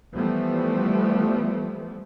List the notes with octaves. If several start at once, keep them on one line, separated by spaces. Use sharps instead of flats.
E3 F3 G3 A3 B3